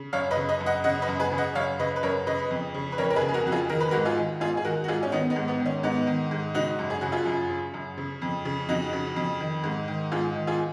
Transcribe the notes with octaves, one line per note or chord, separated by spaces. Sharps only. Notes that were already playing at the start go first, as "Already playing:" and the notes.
Already playing: C#3
F#2 C#5 F5
B4 D#5
C#3
B4 D#5
F#2
D#5 F#5
C#3 D#5 F#5
B4 D#5
F#2
G#4 B4
C#3
D#5 F#5
F#2 C#5 F5
C#3 B4 D#5
B4
F#2 A#4 C#5
C#3 B4 D#5
F2
C#3
B4
F2 A#4 C#5
A#4
G#4 B4
C#3
G#4
F#4 A#4
F2 F#4
F4 G#4
D#3 A#4
B4
G#2 F#4 A#4
F4 G#4
D#3
G#2 F4 G#4
G#4
D#3 F#4 A#4
F#4
G#2 F4 G#4
C#4
D#3 B3 D#4
B3 D#4
G#2
B3
D#3
C#4
G#2 B3 D#4
D#3
G#2
C#3 D#4 F#4
F#2
G#4
C#3 F#4
F4 G#4
F#2
C#3
F#2
C#3
F2
C#3
F2 D#4 F#4
C#3
F2
D#3
G#2
D#3
G#2 F4 G#4
D#3
F4 G#4